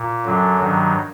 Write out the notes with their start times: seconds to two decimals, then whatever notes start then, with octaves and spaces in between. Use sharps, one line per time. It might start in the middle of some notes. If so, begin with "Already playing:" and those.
Already playing: A#2
0.25 F#2 D3 F#3
0.59 G2 D#3 F#3